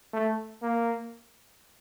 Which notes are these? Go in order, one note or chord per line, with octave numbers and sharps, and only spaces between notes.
A3
A#3